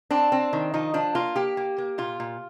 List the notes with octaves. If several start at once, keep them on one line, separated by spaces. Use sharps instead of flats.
C4 D4
C4
D#3
F3 D#4
F3 D4
A#3 F4
A#3 G4
A#3
A#3
A#2 F4
A#2